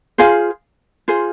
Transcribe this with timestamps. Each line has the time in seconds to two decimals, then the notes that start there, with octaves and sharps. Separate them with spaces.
0.18 F4 G#4 C5 F5
1.08 F4 G#4 C5 F5